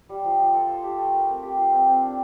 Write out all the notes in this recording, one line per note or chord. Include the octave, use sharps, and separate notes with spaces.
G3
F3
F4
A4
C5
G4
A3
A#4
C4
G4
F4
C4
C4
D4